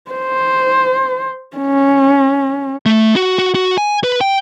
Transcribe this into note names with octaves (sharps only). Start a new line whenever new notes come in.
C5
C#4
A3
F#4
F#4
F#4
G#5
B4
G5